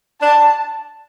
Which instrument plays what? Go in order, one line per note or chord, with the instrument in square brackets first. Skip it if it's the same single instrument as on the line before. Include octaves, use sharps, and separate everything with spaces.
[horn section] D4 [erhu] A5